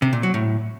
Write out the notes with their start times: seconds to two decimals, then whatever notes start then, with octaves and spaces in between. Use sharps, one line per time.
0.02 C3
0.13 A#2
0.23 F#3
0.34 A2